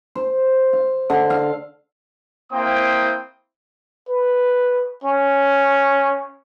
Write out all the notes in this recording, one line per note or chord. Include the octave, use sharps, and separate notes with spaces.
C5
F5
D3
F5
A#3 C4 E4 C5 G5 D#6
B4
C#4